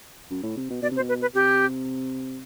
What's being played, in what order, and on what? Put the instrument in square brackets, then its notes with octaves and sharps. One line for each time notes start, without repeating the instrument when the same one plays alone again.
[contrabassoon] F#2
A2
C3
B2
[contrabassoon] B2 [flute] D5
[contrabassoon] C3
[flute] C5
[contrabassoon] B2
[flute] B4
B4
[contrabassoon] C3 [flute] G4